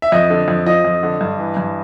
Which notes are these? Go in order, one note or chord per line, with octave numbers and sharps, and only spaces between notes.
E5
F2 D#5
D3
F2
F3 D#5
F2
D3
G2
E3
G2